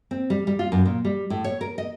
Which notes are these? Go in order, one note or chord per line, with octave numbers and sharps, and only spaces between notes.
C4
G3
G3
F4
F#2
A#2
G3
A2
C#5
A#4
D#5